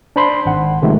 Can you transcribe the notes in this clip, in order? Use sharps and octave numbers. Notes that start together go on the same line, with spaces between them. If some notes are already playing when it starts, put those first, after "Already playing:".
D4 C5 B5 C6
G#1 F#5
C3 D#3 F3 G#3 A3